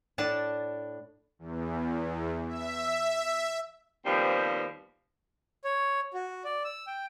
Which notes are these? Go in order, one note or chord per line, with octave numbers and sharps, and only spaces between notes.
A2 D4 A5
E2
E5
D#2 F3 G3 B3 C4
C#5
F#4
D5
E6
G5